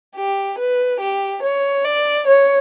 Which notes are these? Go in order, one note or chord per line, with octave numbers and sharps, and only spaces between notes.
G4
B4
G4
C#5
D5
C#5